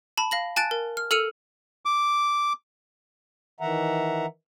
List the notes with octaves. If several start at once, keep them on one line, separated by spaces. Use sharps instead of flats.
A5 B5
F5 A#6 F#7
G#5 A5 F#6 A6 D7
A#4
F6
A4 E6 F6 C#7 D#7 F7
D6
D#3 E3 E5 F#5 A#5